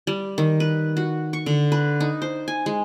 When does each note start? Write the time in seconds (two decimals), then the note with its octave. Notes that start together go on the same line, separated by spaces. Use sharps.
0.07 G3
0.38 D#3
0.60 B4
0.97 F#4
1.33 C#6
1.46 D3
1.72 B4
2.00 D#4
2.22 C5
2.48 G#5
2.66 G#3